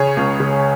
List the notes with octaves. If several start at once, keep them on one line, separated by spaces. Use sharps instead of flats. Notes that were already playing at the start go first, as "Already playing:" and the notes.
Already playing: C#3 G#4 C#5
C#2
C#3